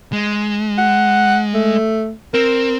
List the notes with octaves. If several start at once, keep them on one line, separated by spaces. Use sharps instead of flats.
G#3
F#5
A3
C4 A#4